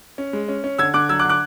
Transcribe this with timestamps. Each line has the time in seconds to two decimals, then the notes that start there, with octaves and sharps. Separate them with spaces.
0.18 C#4
0.33 G#3
0.48 C#4
0.64 C#4
0.79 D3 E6 G#6
0.94 D3 D6 F#6
1.09 F#3 E6 G#6
1.19 D6 F#6
1.24 D3
1.29 D6 F#6